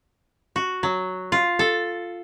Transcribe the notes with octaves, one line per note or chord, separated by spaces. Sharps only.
F#4
F#3
F4
A4